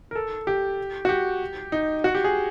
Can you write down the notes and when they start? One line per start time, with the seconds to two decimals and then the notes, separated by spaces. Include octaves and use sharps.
0.11 A#4
0.15 A4
0.47 G4
1.05 F#4
1.09 G4
1.72 D#4
2.04 F#4
2.15 G4
2.24 G#4